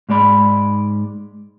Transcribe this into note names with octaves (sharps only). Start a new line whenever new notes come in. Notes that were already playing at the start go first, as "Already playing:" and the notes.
G#2 G#3 D5 B5